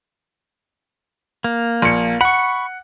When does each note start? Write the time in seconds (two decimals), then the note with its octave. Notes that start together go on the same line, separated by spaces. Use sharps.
1.44 A#3
1.82 A#1 C#7
2.21 F#5 B5 C#6